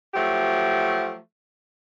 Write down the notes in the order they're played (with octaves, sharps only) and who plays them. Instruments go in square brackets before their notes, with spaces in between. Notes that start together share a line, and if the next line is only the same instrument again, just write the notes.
[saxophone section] F3 F#3 A3 G4